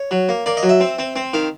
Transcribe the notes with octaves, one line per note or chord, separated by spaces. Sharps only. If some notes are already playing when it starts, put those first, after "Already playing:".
Already playing: C#5
F#3
A#3
A#3 D5
D#5
F#3
E5
C4
C4
C4
D#3 F5